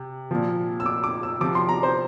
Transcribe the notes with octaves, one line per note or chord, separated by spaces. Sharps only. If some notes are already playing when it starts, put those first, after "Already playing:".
Already playing: C3
A#2 F3
E6
D6
D6
E6
C3 F3 D6
C6
A#5
C5